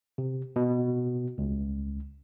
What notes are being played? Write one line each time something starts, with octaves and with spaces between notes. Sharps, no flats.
C3
B2
C#2